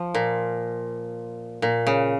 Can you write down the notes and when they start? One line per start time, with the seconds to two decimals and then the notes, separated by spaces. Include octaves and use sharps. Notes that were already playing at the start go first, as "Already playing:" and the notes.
Already playing: F3
0.14 A#2
1.62 A#2
1.87 C#3